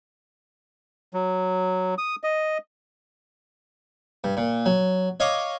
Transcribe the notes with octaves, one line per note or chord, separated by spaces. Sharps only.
F#3
D#6
D#5
G2
A#2
F#3
C#5 D#5 F5 C#6 D6